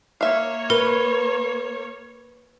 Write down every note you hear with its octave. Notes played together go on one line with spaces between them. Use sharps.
A#3 C#5 E5 F5
A#4 B4